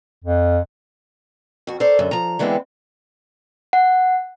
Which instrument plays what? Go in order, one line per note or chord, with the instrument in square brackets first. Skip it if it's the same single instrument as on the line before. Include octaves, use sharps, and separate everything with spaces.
[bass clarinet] F2
[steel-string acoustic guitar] F2 F#4
A4 A#4 C5 D5
F#2 D3
F3 A#5
D3 E3 G#3 B3 C4 E4
[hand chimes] F#5